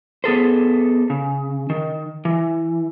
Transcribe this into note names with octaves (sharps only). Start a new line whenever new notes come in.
B3 G#4 A4 C5
C#3
D#3
E3